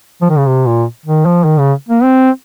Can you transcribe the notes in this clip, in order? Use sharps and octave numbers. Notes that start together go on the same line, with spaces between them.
F3
D#3
C#3
C3
A#2
D#3
F3
D#3
C#3
A#3
C4